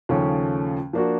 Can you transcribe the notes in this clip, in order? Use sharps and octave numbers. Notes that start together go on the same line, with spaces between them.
D#2 C#3 F3 A3 C#4
F3 A#3 D4 F#4